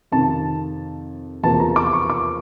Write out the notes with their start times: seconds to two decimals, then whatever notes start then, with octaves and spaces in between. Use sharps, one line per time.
0.12 F2 C3 D#3 A5
1.43 E2 C3 F3 A#3 A5
1.60 A#5
1.76 D6
1.93 C#6
2.10 D6